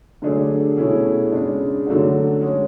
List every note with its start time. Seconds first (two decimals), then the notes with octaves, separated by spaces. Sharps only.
0.22 D3 F#3 A3 D4 G#4
0.77 B2 A3 C#4 E4 G#4
1.32 C#3 G#3 D4
1.87 D3 F#3 A3 D4 F#4
2.41 G#3 C#4 G#4